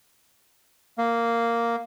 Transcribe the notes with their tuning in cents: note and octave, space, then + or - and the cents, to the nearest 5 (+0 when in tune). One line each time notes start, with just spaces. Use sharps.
A#3 -5